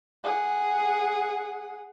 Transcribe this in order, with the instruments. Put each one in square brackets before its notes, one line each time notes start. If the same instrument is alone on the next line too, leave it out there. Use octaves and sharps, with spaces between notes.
[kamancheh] G#4 F#5